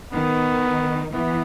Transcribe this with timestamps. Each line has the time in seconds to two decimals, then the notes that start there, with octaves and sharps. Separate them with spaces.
0.13 D#3 B3
1.13 E3 B3